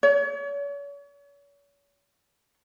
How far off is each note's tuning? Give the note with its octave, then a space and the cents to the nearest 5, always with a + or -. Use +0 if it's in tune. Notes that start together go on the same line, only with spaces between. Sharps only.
C#5 +40